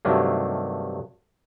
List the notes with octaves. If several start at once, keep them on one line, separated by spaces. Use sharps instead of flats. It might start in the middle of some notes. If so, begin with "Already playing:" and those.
G2 C3 D#3 F#3 A3 A#3